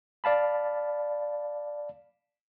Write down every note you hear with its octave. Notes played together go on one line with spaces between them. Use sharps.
D5 F5 A5 B5